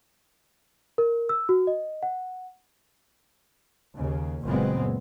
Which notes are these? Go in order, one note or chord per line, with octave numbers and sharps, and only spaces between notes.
A#4
E6
F#4
D#5
F#5
D#2 C#3
F#1 A#2 C#3 G#3 B3 C4